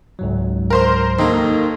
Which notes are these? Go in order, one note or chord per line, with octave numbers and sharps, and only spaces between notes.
C#2 G#2 F#3
A#4 C5 C6
D#2 A#3 A4 D#5 C6